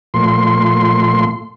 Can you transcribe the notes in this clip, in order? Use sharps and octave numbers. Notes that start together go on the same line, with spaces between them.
A#2 F3 A3 C6